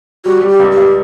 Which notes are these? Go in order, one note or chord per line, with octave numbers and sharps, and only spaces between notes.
G3 F#4
G3
G4
C#2
G4
C#2